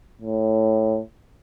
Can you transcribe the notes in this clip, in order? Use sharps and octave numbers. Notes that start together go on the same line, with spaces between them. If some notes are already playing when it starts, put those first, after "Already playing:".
A2